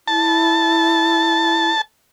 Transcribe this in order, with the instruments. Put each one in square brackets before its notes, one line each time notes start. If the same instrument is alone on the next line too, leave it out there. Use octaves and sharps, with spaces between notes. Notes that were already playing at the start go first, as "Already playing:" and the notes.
[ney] E4 [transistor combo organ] A5